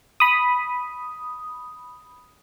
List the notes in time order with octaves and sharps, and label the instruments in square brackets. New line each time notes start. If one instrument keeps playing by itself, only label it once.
[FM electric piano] B5 D#6